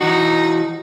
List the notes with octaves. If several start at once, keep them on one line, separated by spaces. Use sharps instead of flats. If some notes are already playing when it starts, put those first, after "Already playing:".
E3 D#4 F#4